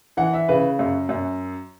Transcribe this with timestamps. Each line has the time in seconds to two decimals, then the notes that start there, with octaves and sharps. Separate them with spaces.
0.17 E3 F#5
0.33 E5
0.48 C#3 B4
0.79 F#2
1.09 F#2